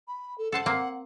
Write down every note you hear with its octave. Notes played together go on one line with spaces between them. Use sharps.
B5
A4
A4 C5 F#5 A5
A#3 C4